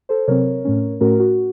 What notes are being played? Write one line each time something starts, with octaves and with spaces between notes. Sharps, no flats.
A4 C5
C3 F#3 C4 A#4 C#5
A2 A3 C#4
A2 A3 C#4 F#4 A#4
F#4